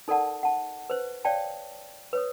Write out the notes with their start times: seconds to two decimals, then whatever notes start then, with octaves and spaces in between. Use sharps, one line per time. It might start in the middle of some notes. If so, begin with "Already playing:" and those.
0.08 D#4 A4 A#4 D5 F#5 A5
0.43 F#5 A5
0.90 B4 C5
1.25 C#5 D5 F5 G5 A5
2.13 B4 C#5 D#6